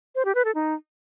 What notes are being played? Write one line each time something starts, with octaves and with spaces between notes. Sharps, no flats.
C5
G4
B4
A4
D#4